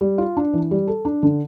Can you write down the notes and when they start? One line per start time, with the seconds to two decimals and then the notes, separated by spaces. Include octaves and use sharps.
0.01 G3
0.18 F4
0.37 D4
0.53 E3
0.71 G3
0.87 A4
1.05 D4
1.23 D3